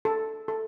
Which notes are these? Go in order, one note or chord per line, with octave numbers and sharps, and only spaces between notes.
A4
A4